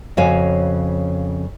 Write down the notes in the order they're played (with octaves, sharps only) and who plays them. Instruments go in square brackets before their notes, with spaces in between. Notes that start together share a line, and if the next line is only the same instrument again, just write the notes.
[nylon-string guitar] F2 C#3 F#4 C#5 F5 G#5